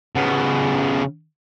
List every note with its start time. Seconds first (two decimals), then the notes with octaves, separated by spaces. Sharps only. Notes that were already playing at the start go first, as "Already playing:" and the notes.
0.16 C#3 B3